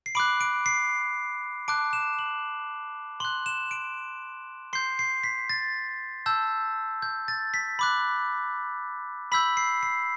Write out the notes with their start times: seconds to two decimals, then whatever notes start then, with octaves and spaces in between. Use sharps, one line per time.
0.06 C7
0.15 B5 D6 F#6 D7
0.41 D7
0.66 C7
1.68 A5 D6 F#6 D7
1.93 E7
2.19 F#7
3.20 C6 F#7
3.25 F#6
3.46 E7
3.71 D7
4.73 C6 G6 C7
4.99 C7
5.24 B6
5.50 A6
6.26 A5 E6 G6
7.02 G6
7.28 A6
7.54 B6
7.79 B5 D6 F#6
9.32 B5 E6 G6 B6
9.57 C7
9.83 C7